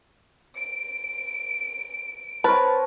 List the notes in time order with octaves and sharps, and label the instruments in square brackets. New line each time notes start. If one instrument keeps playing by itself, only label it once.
[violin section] D7
[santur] C4 A#4 C#5 [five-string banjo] B4 [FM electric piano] A5